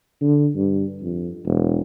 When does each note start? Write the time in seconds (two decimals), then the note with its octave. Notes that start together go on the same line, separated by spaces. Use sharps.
0.21 D3
0.56 G2
1.02 F2
1.45 E1